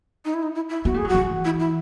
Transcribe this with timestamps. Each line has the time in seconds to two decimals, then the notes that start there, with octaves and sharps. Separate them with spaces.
0.25 D#4
0.34 E4
0.42 D#4
0.55 E4
0.69 E4
0.84 B3 F#4
0.94 A3 G#4
1.05 F#3
1.09 F#4
1.15 E3
1.45 E4
1.59 E4